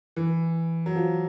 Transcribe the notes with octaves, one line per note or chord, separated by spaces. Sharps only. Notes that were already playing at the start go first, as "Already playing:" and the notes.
E3
F#3
F3